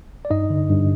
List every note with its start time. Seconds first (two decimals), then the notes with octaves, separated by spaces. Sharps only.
0.25 D5
0.30 G2 D#4 D#5
0.50 D3
0.70 G2